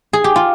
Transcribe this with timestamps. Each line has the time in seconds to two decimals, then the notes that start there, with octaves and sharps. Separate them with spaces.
0.13 G#4
0.24 G4
0.36 F4